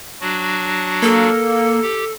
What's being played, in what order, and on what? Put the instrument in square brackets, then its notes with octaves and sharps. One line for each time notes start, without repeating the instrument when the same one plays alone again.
[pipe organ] F#3 D4 F#4
[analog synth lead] A#3 [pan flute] A4
[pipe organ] G4